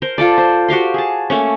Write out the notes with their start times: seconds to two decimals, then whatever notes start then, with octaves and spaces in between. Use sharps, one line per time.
0.02 A#4 C5
0.18 F4 A4 D5
0.38 C5
0.68 F#4 G4 F5 C6
0.94 G#4 A5
1.30 A3 A#3 C#4